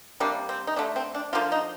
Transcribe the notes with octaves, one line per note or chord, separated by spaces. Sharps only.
C3 G3 A#3 D4
C4
D#4
D3 A3 D4
C4
D4
D3 F3 A#3 F4
D#4